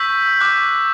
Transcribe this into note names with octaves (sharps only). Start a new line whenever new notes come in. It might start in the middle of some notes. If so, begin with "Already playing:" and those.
Already playing: C#6 E6 G6 B6
D6 F#6